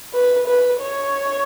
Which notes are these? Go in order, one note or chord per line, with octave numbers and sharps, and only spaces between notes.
B4
B4
C#5